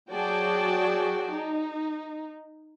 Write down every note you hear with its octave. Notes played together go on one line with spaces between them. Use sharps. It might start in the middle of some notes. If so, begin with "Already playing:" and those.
F#3 F#4 G#4 D5 G5 A5
D#4